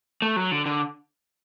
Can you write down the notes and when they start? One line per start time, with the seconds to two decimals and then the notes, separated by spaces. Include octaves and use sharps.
0.22 A3
0.36 F#3
0.52 D3
0.66 D3